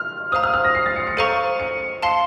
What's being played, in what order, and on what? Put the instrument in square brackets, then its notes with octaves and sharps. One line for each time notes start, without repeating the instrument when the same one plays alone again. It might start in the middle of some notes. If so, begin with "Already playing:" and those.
Already playing: [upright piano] F6
[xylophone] C5 F5 A#5 [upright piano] D#6
[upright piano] F6
F6
A#6
C7
A6
C#7
C#7
[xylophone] A4 C5 F5 A#5 C#6 [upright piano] D#7
[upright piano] C#7
[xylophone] F5 A5 C6 [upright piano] C7